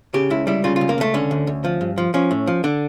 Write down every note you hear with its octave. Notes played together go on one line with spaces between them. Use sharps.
C#3 G4
C#2 E4
G3 E4
C#3 F4
F4
C#2
A#3
C#2 A3
D3 C#4
D2
D2
F3
G2
F3
F3 C#4
A2
F3
D3 D4